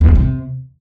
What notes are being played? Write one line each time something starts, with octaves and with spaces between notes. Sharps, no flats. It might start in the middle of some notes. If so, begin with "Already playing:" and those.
E2
G2
C3